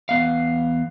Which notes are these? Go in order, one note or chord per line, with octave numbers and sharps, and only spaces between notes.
E2 B3 F5